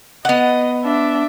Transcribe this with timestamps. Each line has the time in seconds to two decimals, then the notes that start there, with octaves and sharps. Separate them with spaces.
0.25 B3 D#5 F#5
0.84 D4 E5